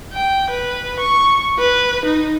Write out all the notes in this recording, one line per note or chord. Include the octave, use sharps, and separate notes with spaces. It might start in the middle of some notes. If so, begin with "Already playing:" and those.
G5
B4
C#6
B4
D#4